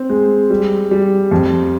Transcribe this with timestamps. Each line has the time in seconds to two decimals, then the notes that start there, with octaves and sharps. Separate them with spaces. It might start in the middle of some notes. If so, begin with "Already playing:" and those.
Already playing: C4
0.09 G#3
0.50 G3
0.91 G3
1.31 F2